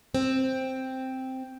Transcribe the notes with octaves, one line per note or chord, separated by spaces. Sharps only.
C4